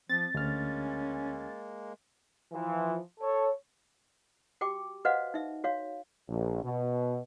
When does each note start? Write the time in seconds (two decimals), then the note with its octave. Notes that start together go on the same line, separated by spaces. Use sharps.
0.09 F3 C4 A6
0.35 D2 G#3 A#3 C#4 F6
2.53 E3 F3
3.20 A4 C#5
4.61 F#4 G4 G5 D6
5.05 F#4 B4 C5 D#5 F5 F#5
5.34 D#4 E5
5.64 F#4 C#5 F5
6.28 A#1
6.64 B2